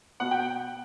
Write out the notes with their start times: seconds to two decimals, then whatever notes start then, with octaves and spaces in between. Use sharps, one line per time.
0.20 B2 F#5
0.31 G5